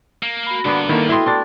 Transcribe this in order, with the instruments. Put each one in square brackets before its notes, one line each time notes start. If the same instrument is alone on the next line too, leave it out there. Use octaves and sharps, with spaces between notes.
[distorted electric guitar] A#3
[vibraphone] F#4 B5
[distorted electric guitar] G2 [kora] D3 A#3 B3
[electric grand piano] D#3 A#3 [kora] E4 [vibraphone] A4
[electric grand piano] E4 C6 [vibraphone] F#4 A4 G5 [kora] D#5 F5
[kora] A3 D4 E4 [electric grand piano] C6 A6